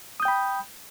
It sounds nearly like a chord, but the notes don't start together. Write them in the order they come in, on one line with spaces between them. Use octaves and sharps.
D#6 G6 G5 B5